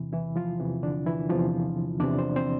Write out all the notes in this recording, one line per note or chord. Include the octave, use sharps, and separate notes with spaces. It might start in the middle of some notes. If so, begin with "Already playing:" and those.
Already playing: E2 C3 E3
E3 E4
F3 F4
E2 C3 E3
D3 D4
E3 E4
E2 C3 E3 F3 F4
E2 C3 E3 D4 D5
C4 C5
C4 C5